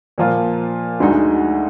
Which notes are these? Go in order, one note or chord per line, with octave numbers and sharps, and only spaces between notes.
A#2 F3 A#3 F4
D2 D3 G#3 D#4 F#4